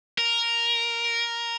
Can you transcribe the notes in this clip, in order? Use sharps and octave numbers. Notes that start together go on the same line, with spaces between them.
A#4